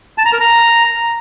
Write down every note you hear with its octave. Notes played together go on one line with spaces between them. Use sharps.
A5
A#5
A#4
A#5